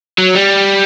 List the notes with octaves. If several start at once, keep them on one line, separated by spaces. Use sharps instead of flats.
F#3
G3